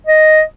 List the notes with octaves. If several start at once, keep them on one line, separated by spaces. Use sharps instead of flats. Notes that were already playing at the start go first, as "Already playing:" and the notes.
D#5